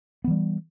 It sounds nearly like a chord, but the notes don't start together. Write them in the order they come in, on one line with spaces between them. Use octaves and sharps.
B3 E3 G3